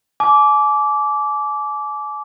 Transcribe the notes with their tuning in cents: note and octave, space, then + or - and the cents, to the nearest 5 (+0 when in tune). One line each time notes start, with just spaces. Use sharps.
G#5 +40 D6 -15